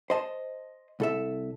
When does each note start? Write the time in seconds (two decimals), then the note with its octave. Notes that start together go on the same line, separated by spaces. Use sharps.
0.10 C5 D#5 A5
1.00 C2 A4 E5